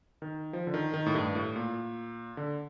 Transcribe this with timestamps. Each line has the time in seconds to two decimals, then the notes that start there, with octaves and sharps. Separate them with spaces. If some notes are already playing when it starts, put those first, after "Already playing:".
0.22 D#3
0.53 F3
0.67 D3
0.74 D#3
0.94 D#3
1.06 A2
1.15 G2
1.35 A2
1.56 A#2
2.37 D3